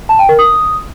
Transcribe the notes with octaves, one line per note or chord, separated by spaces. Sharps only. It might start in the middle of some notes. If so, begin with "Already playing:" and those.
A5
G5
A#4
D#6